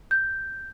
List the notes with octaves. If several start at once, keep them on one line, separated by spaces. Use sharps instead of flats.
G6